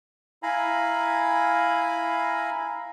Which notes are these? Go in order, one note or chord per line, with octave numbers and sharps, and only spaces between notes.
E4 F5 G#5 A#5 B5